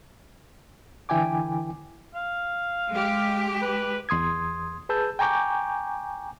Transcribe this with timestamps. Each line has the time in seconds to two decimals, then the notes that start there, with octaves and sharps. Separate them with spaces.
1.09 D3 E3 E4 G5 G#5 D6
2.15 F5
2.91 G#3 G4
3.62 B4
4.09 E2 C6 D#6 G#6
4.89 G#4 B4 A5 E6 G6
5.19 G5 G#5 A#5 C#6 D6 G6